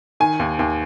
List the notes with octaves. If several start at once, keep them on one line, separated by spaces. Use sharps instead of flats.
D#3 G#5
D#2
D#2